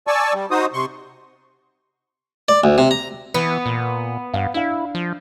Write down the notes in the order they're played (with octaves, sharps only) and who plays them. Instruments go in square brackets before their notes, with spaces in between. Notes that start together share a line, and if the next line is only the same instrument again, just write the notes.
[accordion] D5 G#5 A5 C#6 E6
G3
D#4 F#4 C5 D#6
C3 C6 C#6
[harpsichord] D5
D2
C3
A#5
[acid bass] E3 [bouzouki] B3
[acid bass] A#2
[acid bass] G2 [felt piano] F5 F#5
[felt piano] D4 F5 [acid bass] E4
[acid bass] F3